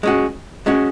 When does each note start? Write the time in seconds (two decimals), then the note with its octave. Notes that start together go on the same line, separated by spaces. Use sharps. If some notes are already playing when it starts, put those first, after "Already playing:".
0.03 G#3 C#4 F#4
0.66 G#3 C#4 F#4